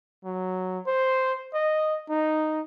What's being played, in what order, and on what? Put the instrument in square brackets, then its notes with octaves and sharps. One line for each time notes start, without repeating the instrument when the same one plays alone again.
[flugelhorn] F#3
C5
D#5
D#4